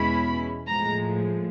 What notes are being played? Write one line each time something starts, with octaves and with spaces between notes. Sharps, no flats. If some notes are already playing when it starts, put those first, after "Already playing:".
Already playing: E2 B2 G#3 C#4 E4 B5
A2 F3 G#3 A#5